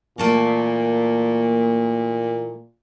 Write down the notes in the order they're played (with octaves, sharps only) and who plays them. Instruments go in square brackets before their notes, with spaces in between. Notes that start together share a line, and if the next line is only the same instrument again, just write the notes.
[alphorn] A#2 [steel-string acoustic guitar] E3 A3 A#3